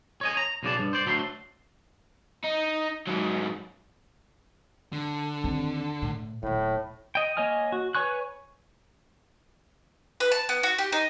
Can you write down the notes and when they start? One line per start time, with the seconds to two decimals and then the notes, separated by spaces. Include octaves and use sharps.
0.21 C#5 D#5 G#5
0.37 A#5
0.63 B1 C#3 D5 A5
0.79 G2
0.93 C5 D5
1.06 D2 F#3 A3 B5 C6
2.44 D#4
3.07 G#2 F#3
4.93 D3
5.44 D#2 C4
6.02 A2
6.43 D#1 A2 F#3
7.15 D#5 G5
7.37 A#3 C#5 D#5 G#5 F6
7.72 F#4
7.95 B4 C#5 G#5 C#6 F#6
10.20 B4
10.32 A5
10.49 B3
10.63 F#4
10.78 G4
10.92 D#4